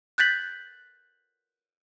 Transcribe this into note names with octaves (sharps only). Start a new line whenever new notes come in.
F#6 G6 A6 B6 F#7